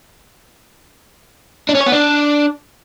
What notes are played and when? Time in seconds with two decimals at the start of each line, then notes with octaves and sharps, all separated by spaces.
1.69 D4
1.75 C#4
1.81 C#5
1.86 B3
1.92 D4